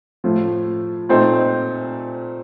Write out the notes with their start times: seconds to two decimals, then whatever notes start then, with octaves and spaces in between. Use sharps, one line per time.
0.24 A2 F3 A3
1.09 A#2 A3 C4 D#4